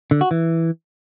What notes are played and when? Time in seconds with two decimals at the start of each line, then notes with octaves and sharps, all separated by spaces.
0.11 D3
0.21 F#4
0.31 E3